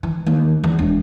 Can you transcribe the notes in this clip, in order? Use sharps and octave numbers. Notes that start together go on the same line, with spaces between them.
E3
D#2
E2
E1